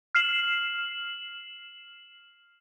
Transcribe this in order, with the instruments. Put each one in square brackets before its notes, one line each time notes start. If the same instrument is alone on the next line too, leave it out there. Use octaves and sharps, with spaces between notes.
[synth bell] F6 C7 E7 F#7